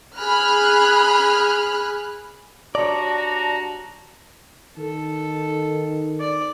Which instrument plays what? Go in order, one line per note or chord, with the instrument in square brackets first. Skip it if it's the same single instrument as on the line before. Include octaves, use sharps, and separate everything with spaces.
[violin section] G#4 B5 F6 F#6
[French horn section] G3 D4 F#4 [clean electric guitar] C#5 D5 [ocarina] A5 [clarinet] A#5
[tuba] D#3 [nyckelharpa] A4
[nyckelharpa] D5